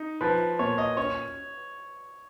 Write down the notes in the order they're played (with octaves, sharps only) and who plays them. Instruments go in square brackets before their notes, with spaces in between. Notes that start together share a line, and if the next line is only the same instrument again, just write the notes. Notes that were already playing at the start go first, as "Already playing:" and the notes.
Already playing: [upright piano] D#4
[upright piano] F3 [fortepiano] B4
[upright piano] A#2 [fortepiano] C#5
[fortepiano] D#5
[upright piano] C#4 [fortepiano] C#5